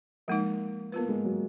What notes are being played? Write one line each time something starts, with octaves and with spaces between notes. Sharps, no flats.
F3 G#3 A#3 D#4
A#3 B3 F4 B4
G#3
F#3